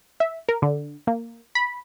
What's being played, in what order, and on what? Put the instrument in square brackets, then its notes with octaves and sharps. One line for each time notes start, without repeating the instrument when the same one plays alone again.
[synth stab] E5
A#4
D3
A#3
B5